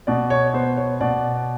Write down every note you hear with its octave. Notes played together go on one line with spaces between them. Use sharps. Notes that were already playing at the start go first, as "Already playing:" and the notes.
B2 D5
C#5
B3 C5
C#5
B2 D5